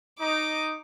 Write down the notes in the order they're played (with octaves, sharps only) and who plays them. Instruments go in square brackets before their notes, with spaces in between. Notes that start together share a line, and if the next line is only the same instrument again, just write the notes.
[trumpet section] D#4 [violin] D6